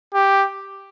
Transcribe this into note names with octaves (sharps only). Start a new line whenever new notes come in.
G4